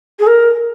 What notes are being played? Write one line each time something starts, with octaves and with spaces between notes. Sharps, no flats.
G#4
A#4